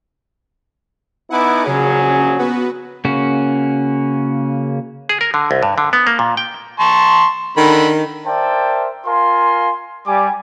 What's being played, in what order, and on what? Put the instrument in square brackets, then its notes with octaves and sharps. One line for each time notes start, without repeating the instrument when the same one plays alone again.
[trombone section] B3 D#4 E4 [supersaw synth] F#5 G#5 D6
[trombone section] A#1 F#3 G#4 [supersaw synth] C#3 C#4
[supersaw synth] B3 F#4 B4
[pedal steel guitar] C#3 A#3 C#4 F#4
[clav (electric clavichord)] G#4
A#4
D3
C2
G2
D3
B3
A#3
A#2
G5
[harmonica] A5 C6 C#6
[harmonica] D3 B5 [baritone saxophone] D#3
[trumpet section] A#4 C5 D5 E5 G5 A5
F4 A#4 F5 G#5 C6
G3 G#5 D6